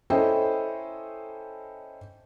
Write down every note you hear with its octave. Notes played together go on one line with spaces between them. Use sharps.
C#4 E4 A4 C5 D#5 G5